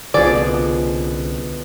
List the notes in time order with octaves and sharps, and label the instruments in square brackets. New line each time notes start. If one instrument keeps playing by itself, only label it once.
[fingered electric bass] C2 D3 [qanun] B2 F3 [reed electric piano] G#4 [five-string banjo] D5